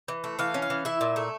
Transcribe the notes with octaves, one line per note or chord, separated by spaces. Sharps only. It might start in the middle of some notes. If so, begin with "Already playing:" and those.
E3
A3
E3 F5
C#4
F5
E3
E4 E5
A#2
A3